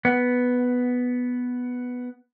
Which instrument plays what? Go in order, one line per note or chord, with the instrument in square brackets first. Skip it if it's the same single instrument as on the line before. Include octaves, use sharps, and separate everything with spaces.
[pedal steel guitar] B3 F#5